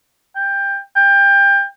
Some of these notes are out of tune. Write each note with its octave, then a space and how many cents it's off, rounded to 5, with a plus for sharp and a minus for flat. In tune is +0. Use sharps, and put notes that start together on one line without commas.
G5 +15
G5 +25